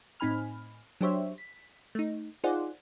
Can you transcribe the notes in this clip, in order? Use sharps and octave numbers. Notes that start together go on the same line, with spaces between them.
A2 C4 D#4 G#5 B5 F6
F#3 D4 G4 C5 C#5 E5
B6
A3 D#4
D#4 F4 G#4 C5 D5 F#5